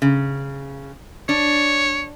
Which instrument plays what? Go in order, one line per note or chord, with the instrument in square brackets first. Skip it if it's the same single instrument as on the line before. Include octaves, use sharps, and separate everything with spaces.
[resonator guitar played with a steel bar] C#3
[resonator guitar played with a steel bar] D4 [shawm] C#5